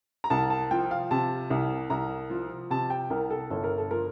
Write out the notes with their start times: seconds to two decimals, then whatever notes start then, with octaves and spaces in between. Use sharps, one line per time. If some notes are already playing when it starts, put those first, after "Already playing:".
0.24 A#5
0.30 C2 A5
0.50 A5
0.71 F3 G5
0.91 F5
1.11 C3 A5
1.50 C2
1.90 C2 A#5
2.30 F3
2.70 C3 A5
2.90 G5
3.10 C2 A#4
3.30 A4
3.50 G1 A4
3.64 A#4
3.78 A4
3.91 F3 A#4